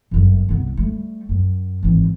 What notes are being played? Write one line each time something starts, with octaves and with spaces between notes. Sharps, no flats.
G1 F#2
C2 B3
G3 A3
F#2
G#1 E3